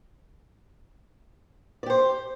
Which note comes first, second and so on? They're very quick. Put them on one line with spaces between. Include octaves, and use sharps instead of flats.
D5 G4 C5